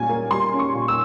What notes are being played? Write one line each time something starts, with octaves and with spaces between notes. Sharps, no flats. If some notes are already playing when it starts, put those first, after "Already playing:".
Already playing: A#2 G3 C#4 G#5
A#3
G3 C6
C#4
C#6
A#2
E6